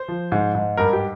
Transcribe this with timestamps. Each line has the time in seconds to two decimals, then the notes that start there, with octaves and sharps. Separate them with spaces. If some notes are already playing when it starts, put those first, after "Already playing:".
Already playing: C5
0.08 F3
0.32 G#2
0.55 G#2
0.77 G2 A#4
0.93 G4